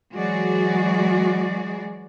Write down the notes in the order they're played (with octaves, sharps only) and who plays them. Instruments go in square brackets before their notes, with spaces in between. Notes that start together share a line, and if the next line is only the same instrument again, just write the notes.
[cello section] E3 F#3 G#3 F#4 G#4 D5